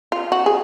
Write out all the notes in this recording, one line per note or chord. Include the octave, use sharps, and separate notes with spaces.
F4
F#4
G#4